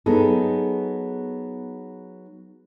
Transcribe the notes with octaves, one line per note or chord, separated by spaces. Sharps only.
F#3 B3 D#4 G#4 A4